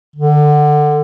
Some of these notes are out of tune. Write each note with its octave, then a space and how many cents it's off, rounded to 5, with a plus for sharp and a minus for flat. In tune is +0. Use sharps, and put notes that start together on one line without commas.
D3 +20